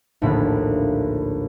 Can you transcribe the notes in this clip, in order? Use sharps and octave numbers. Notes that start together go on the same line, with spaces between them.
A#1 D#2 A2 D3 B5